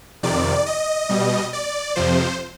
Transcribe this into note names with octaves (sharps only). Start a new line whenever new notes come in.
F2 C3 D#3 D5
D#5
B2 G3
D5
F2 C3 F3 C5